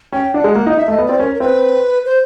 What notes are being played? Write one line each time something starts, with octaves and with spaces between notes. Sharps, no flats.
C#4 G5
G5
D4 F#5
G#3
A#3
D#4
D#5
D#4 E5
A3
D#5
B3
C4 D5
C#4 A#4
A#4
C4 B4
C5